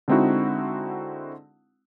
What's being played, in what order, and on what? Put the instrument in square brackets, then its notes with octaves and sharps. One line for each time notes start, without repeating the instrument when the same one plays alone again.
[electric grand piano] D3 G#3 C4 D#4 E4 F#4